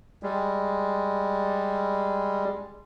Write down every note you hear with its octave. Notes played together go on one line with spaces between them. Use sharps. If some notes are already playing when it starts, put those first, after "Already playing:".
G3 G#3